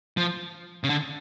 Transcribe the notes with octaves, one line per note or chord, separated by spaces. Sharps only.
F3
C#3
D3